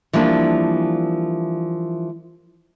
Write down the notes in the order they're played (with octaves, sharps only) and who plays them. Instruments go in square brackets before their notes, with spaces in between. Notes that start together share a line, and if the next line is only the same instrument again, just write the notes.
[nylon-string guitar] E3 F3 G3 A#3 D4